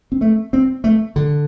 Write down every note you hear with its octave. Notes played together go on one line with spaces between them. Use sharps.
C4
A3
C4
A3
D3